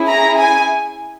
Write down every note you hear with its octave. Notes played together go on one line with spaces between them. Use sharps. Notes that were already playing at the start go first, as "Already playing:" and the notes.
Already playing: C#4 E4 G#4
A#5
G#5